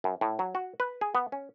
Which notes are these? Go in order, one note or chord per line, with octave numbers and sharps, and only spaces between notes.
F#2
A2
F#3
F#4
B4
G#4
B3
C#4